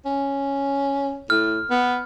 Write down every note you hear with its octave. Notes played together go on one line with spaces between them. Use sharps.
C#4
A2 F6
B3